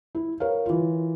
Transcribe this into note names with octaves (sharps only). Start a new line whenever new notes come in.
E4
A#4 C#5 F5
E3 F4